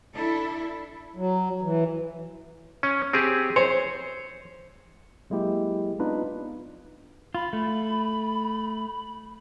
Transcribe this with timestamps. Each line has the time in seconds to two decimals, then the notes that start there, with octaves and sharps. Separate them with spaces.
0.12 D4 E4 A4
1.16 F#3
1.62 E3
2.83 C#4
3.13 C4 G4 G#4
3.56 C5 C#5
5.30 F#3 G#3 A#3 E4 G4
5.99 B3 C4 D4 D#4 F4 B4
7.35 F4 B5
7.53 A3